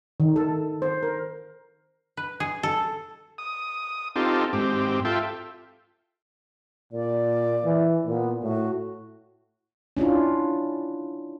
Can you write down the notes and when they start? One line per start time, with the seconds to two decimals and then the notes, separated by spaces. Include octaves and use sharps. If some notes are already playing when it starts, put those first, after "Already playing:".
0.20 D#3
0.36 A4
0.82 C5
1.03 A#4
2.17 B4
2.40 G#4
2.63 A4
3.38 D#6
4.16 C4 D#4 F4 G4 A4
4.53 G#2 C4 G4
5.05 F4 A4 E5 G5
6.93 A#2 D5
7.65 E3
8.07 A#2 B3
8.43 A2 F#4
9.97 C#4 D4 E4 F4